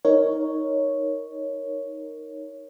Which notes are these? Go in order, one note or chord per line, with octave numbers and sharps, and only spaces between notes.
D#4 A#4 C#5